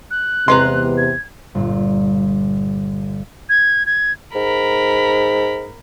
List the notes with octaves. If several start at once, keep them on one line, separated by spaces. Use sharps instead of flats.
F#6
E2 C3 G#3 B4 A#5 C6
G#6
G1 A#2
G#6
G#6
G#2 A#4 B5